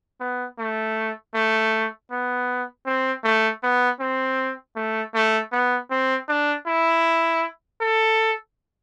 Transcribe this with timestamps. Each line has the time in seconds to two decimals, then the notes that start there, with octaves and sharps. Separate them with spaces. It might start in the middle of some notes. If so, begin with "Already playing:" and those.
0.20 B3
0.58 A3
1.34 A3
2.11 B3
2.86 C4
3.24 A3
3.63 B3
4.00 C4
4.76 A3
5.14 A3
5.52 B3
5.91 C4
6.28 D4
6.67 E4
7.81 A4